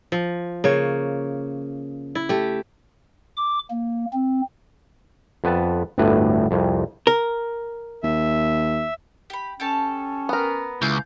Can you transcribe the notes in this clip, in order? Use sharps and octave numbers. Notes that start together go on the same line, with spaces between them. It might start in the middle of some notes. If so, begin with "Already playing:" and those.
F3
C#3 A#3 C#5
E4
A3 G4
D6
A#3
C4
F2 B3 B4 A5
G1 D2 A2 B4
C2 F2
A#4
D#2 E5
G4 B5
C#4 G4 A4 A5
B3 A#4
C#2 E4 F5 G6